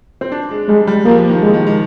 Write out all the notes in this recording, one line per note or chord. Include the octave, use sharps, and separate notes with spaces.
C4
D4
G#3
G3 G#3
G3
F3 A#3
D#3
G#3
D#3
D#3